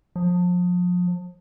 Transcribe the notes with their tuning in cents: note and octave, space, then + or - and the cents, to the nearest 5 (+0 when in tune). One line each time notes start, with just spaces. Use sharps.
F3 +35